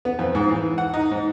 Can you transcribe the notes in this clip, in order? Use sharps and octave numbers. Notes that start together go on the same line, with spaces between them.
B3
F2
G#2
E3
F#5
D#4
G#2